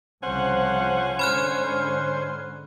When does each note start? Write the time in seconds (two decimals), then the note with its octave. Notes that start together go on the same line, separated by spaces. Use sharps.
0.23 C2 C#3 F3 C#4 C5 F#5
1.19 G#2 D3 C5 B5 F6 F#6